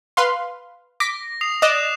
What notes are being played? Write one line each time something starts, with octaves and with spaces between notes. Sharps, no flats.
B4 F5 C6
D6 A#6 B6
D#6 C7 F7
D5 D#5 D6 F#6 E7